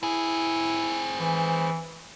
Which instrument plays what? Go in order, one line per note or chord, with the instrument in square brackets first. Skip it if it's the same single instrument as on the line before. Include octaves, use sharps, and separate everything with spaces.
[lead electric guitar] C4 G#4 [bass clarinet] E4
[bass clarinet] E3